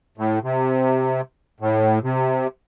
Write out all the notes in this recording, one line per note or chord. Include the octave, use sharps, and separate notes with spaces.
A2
C3
A2
C3